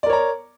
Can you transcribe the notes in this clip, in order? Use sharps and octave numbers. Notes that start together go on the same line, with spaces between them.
A#4 C#5 D5 A#5